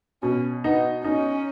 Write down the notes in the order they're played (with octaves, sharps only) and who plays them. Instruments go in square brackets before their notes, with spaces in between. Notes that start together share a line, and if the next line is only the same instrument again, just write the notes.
[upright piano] B2 [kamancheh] C#4
[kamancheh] B3 [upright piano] D#4
[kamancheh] C#4 [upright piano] D#4